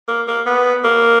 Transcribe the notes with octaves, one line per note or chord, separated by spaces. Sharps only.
A#3
A#3
B3
A#3